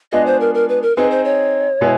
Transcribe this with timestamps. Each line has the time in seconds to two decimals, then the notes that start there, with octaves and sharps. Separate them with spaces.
0.12 G#3 B3 D4 F4 G#4 D#5
0.26 C5
0.40 A#4
0.54 A#4
0.69 B4
0.82 A#4
0.97 C4 D#4 G#4 B4
1.11 C5
1.25 C#5
1.81 B2 G#3 B3 E4 G#4